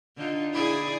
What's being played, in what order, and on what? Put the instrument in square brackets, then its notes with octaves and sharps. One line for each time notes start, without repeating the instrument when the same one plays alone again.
[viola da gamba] D3 D#4 F4
[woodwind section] E4 [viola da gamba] G#4 D5